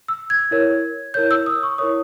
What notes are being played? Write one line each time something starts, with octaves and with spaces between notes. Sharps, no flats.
E6
G#6
E4 A#4 C#5
E4 A#4 C#5 G6
E6
D#6
C#6
E4 A#4 C#5 D#6